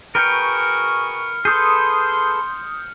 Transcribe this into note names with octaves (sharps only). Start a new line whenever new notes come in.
F#4 G#4 A#4 B4 G5 C#6 F6 C#7
G#4 A4 B4 C6 D#6 G6